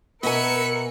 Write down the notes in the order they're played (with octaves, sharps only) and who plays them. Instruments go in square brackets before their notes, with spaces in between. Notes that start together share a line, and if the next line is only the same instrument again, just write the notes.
[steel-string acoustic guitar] B2 G#5 [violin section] A#4 C#7 [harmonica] B4 E5